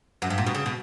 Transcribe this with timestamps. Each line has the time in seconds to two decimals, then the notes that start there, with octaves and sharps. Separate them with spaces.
0.22 F#2
0.30 G2
0.38 A#2
0.46 B2
0.55 C#3
0.66 B2